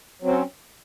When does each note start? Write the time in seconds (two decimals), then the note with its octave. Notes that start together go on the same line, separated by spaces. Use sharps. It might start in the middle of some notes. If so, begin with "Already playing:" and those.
0.22 F#3
0.25 C4
0.27 C#4